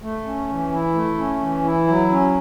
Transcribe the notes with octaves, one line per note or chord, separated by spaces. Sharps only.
A3
C#4
E3
E4
A3
C#4
E3
E4
F#3
C#4